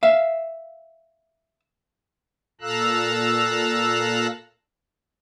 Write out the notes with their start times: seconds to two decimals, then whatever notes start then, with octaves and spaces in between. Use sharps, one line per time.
0.03 E5 F5
2.61 A#2 A4 F5 A#5 E6 F#6